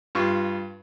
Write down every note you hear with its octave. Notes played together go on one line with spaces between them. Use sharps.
G2 F4 C#6